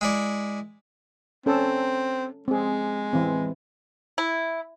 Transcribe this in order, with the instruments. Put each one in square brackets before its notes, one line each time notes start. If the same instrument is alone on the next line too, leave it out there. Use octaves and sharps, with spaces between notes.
[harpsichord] G#3 E4 D5
[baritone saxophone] C4 [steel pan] C#4 A4
[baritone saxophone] G#3 [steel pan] C4 G#4
[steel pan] E3 C4
[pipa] E4